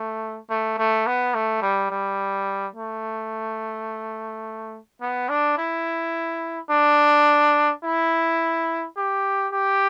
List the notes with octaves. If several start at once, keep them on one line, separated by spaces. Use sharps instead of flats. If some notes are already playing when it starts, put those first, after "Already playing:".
Already playing: A3
A3
A3
B3
A3
G3
G3
A3
B3
D4
E4
D4
E4
G4
G4